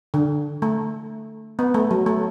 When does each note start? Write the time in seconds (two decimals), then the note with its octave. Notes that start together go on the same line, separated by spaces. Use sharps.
0.14 D3
0.62 A3
1.59 B3
1.74 A3
1.91 F#3
2.06 A3